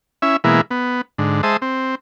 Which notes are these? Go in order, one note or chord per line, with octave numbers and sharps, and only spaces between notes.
C#4 E4 E5
B2 E3 G#3 A#3 E4
B3
G#2 D3
G#3 C5 E5 A5 D#6
C4